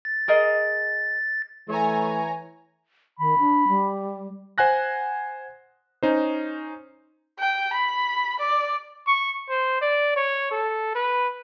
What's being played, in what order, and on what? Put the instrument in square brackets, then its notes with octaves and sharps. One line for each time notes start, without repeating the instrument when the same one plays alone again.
[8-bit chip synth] A6
[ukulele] G#4 A#4 D#5
[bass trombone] E3 [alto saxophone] A3 [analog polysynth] C#5 G#5 A#5
[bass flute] D#3 [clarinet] B5
[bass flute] D4
G3
[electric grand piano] C5 F#5 G#5 F#6 A#6
C#4 D#4 C5
[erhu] G5
B5
D5
[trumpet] C#6
C5
D5
C#5
A4
B4